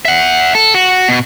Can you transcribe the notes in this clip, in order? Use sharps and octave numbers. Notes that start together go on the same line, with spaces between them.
E5 F#5
A4
F#4
B2